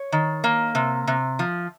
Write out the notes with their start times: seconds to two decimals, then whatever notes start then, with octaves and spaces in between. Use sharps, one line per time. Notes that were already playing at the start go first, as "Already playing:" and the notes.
Already playing: C#5
0.12 D#3
0.44 A#3
0.75 C3
1.07 C3
1.39 F3